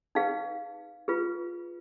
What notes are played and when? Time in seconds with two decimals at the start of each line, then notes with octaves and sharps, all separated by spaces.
0.15 D#4 G#4 B4 F5
1.08 F4 G#4 B4